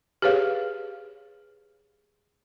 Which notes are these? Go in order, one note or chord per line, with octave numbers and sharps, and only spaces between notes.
G4 G#4 B4 C#5 F5